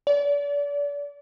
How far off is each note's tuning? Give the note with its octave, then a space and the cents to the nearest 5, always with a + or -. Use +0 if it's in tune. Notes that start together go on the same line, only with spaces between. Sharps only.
D5 -35